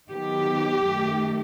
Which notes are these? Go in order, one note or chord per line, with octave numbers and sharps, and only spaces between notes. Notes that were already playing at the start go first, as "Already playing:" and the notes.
D#3 F#3 B3 G4
F#2 D#3 A3